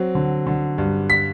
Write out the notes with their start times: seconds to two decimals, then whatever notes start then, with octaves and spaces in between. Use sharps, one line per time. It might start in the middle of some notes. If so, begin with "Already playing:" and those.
Already playing: F#3 C4
0.15 D3
0.47 D3
0.78 G2
1.10 B6